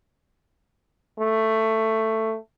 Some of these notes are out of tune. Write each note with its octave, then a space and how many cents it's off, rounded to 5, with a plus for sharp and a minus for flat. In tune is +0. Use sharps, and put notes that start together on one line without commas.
A3 +10